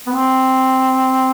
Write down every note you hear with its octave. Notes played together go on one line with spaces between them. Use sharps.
B3
C4